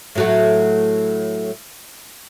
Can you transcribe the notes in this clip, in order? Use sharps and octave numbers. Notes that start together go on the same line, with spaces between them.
A2 F#3 A3